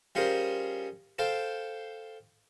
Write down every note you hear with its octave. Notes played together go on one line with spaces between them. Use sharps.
G3 C#4 F4 G#4 A#4 C5
A4 C5 F5 G5